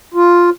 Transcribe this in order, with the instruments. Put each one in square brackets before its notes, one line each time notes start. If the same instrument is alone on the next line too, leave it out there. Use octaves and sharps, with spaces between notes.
[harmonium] F4